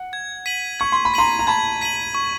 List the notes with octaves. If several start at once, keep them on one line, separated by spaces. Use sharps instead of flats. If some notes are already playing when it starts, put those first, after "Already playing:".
Already playing: F#5
G#6
B6 D#7 F#7
C#6 G#6
C6
B5
A#5 C6 B6 D#7 F#7
A#5
A5 B5 G#6
B6 D#7 F#7
C#6